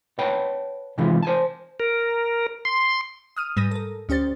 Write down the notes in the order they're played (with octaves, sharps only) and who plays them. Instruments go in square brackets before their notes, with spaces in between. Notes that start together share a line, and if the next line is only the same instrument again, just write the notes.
[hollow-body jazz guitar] B4 C#5 F#5 G5 A5 B5
C3 D#3 E3 G#3 E4 F4
C5 G#5 A5
[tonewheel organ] A#4
C6
[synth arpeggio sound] D#6 F6 D#7
G#2 G3 B4 D#6 A#6 D#7
A4 A#4
D2 C#4 G4 C5 A6